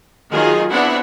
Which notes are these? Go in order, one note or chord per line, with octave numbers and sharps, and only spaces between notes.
D#3 F#3 F4 G#4 D#5
B3 C4 D4 E4 E5 F#5